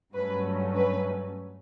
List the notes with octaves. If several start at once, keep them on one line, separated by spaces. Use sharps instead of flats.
G2 F#3 A3 C#4 B4
B4